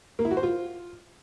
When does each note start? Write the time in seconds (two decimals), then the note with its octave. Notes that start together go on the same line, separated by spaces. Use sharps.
0.19 A#3
0.25 E4
0.31 F#4
0.37 C5
0.43 F4